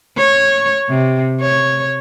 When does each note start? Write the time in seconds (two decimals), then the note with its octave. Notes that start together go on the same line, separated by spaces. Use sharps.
0.17 C#5
0.89 C3
1.41 C#5